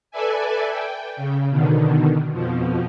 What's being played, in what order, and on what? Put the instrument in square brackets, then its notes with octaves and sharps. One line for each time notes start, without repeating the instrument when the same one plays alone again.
[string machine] A4 B4 D5 E5 G#5
G5
C#3
B2 D3 D#3
F2 B2 F3